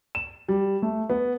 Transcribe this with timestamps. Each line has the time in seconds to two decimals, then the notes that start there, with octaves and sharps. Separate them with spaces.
0.15 E7
0.49 G3
0.82 A3
1.10 B3